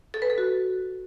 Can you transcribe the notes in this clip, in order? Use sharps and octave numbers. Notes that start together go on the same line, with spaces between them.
A4
B4
A4
F#4